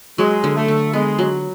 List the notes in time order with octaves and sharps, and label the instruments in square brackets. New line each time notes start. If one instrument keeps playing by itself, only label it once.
[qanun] F#3 [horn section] G#3
[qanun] D3
[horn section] A3
[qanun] D3
[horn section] G#3 [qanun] B3
[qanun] F#3